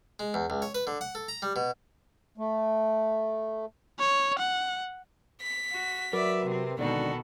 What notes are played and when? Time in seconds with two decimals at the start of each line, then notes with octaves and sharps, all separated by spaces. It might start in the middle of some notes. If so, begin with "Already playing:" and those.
0.19 G#3
0.34 E2
0.50 C#2
0.62 C#5
0.75 B4
0.87 D3
1.01 F#5
1.15 A4
1.28 A#5
1.42 G3
1.56 B2
2.38 A3
3.99 C#5
4.39 F#5
5.42 B6
5.72 F#4
6.13 F#3 A#4 B4 D5 E5
6.45 C3 C4
6.79 G#1 B2 D3 D#3 F#4 A4 D5